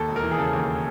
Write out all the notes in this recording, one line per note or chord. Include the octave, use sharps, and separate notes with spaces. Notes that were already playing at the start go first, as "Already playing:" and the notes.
Already playing: D#2 A4
E1
A#4
E3
G#4
C#3 A4
D#2